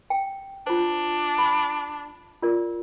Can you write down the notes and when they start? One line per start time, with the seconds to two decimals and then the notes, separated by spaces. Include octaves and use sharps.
0.10 G5
0.67 D4 F4 C5
1.38 B5
2.42 F4 A#4 D5